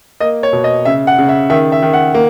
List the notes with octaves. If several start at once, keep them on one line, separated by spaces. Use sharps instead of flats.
A#3 D#5
C#5
B2
D#5
C#3 E5
F#5
C#3
E5
D#3 E5
E5
D#3
F#5
A#3